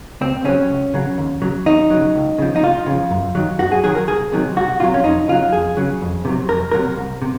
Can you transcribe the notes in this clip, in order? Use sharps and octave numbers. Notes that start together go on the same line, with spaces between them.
C#2 C4
C#3 F#3 C#4
C#2
C#3 F#3
D#2
C#3 F#3
D#2 D#4
C#3 F#3
C#2
C#3 F3
D#4
C#2 F4
C#3 F3
F#2
D#3 F#3
F#2 F#4
G#4
D#3 F#3 G#4
A#4
C2 G#4
C3 D#3 F#3
C2 F#4
C3 D#3 F#3 F4
C#4
F2 D#4
C#3 F#3 F4
F2 G#4
C#3 F#3
F2
C3 D#3 F#3
F2 A#4
C3 D#3 F#3 A#4
C2
C3